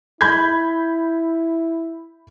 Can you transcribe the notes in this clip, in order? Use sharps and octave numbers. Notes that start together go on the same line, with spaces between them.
E4 B5 G6 G#6